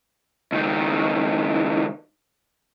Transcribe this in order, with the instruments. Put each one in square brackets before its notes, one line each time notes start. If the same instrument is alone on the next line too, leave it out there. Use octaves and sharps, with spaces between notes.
[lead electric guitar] C#2 D#3